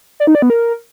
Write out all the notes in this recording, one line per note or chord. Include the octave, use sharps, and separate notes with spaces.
D5
D#4
D5
B3
A#4